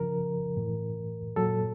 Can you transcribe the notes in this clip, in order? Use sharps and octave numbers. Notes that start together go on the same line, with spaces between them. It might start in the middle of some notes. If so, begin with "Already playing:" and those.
Already playing: C#3 F3 A#4
A2 E3
A#2 F#3 A4